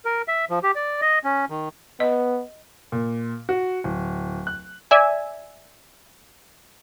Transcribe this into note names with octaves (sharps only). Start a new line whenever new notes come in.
A#4
E5
F3
G4
D5
D#5
C#4
D#3
B3 D#5
A#2
F#4
D1
F#6
D5 E5 G#5